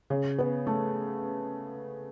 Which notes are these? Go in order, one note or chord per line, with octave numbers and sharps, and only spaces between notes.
C#3
B3
A3